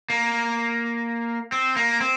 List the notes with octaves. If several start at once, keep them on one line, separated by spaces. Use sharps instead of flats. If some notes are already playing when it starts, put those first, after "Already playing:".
A#3
C4
A#3
C4